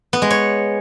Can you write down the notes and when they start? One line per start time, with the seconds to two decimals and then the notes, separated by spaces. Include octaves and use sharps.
0.13 B3
0.22 G#3
0.30 C#5